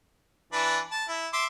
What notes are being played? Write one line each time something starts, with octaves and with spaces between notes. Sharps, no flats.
E3 D4 B4
A5
E4
E5 C6 D6